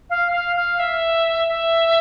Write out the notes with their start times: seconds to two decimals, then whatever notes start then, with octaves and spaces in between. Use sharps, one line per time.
0.10 F5
0.32 F5
0.56 F5
0.79 E5
1.48 E5